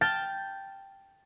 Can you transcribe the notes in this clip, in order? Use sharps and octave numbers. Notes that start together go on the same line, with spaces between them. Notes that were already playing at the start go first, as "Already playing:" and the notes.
G5 A5 F6 G6 A6